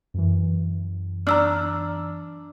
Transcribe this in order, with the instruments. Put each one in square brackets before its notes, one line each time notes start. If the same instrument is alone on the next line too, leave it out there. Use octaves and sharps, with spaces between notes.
[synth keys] F#2 E3
[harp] D4 [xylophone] A#5 E6 F6